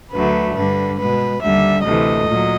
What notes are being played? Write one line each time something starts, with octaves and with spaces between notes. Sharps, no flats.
D2 D3 F#3 A3 B4
G2 D3 G3 B4
B2 G#3 B4
D#2 D3 G3 E5
D2 C3 E3 A3 D#5
A#2 F#3